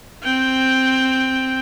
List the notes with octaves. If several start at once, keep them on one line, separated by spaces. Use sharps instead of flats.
C4 G5